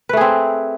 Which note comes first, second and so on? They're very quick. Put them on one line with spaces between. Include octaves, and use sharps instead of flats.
B4 A3 G#4 C4